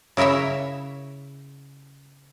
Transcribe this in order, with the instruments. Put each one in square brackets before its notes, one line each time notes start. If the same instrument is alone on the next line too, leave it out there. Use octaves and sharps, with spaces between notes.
[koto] C#3 E4 A#4 C#5 E5